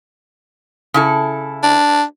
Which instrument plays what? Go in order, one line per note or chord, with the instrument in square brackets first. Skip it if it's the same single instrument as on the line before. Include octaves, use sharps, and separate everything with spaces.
[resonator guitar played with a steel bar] C#3 E4 A4
[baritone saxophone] D4